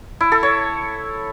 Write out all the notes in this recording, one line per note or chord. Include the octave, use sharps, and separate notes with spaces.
E4
A4
C#5